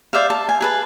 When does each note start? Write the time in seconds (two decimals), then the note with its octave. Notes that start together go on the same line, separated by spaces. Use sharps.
0.13 C5 D5 E5 F5
0.30 A5
0.49 G#5
0.61 G#4 B4 A5